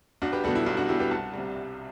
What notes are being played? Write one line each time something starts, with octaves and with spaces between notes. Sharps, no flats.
B1 D4 F#4
G4 B4
B2 G3 F#4 A4
E4
B1 E4
D4 F#4
B2 G3 E4 G4
G4 B4
C2 F#5 A5
C3 G3
C2